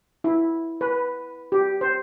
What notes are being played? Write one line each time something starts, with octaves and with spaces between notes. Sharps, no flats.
E4
B4
G4
C5